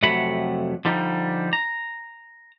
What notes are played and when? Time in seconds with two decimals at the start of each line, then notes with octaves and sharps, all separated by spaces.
0.03 F2 C3 F#3 A3 F#5 B5
0.85 D3 F3 G3 D#4
1.53 A#5